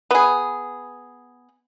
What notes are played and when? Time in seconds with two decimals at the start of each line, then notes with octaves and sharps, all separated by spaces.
0.11 B3 G#4